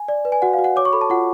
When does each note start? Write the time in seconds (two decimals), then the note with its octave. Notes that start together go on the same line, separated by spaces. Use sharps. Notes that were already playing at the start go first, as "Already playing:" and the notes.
Already playing: G#5
0.08 D5
0.25 B4
0.32 G#5
0.42 F#4 F#5
0.53 F5
0.59 F#4
0.64 F#5
0.76 C#5 D6
0.85 C#6
0.93 A4 B5
1.01 A5
1.10 F4 F#5